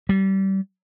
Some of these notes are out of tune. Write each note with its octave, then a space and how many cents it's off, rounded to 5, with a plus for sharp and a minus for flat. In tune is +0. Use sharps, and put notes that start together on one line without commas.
G3 -25